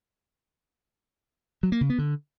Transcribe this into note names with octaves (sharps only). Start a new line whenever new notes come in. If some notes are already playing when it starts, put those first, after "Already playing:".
F#3
A#3
C#3
B3
D3